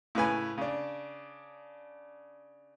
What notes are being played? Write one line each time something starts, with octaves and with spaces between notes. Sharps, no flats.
A2 C#3 B4 G#5
C#3 D4